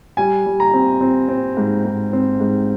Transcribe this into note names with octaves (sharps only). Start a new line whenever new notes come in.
G3 G#5
G3
A#5
C4
C4
C4
G#2
G#2
C4
G#2